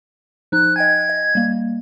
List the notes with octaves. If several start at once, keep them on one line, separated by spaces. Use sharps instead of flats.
F3 D#4 F#6
D#5 G5 G#5 G#6
D#5
G3 A#3